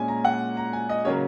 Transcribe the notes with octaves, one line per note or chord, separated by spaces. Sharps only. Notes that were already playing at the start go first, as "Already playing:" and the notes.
Already playing: A#2 G#3 C#4 G#5
A#5
F#5
A#5
G#5
D#5
C#3 F#3 A#3 C#4 C#5